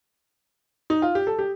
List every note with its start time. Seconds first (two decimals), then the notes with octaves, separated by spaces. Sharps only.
0.90 D#4
1.02 F4
1.15 G4
1.27 A4
1.39 G4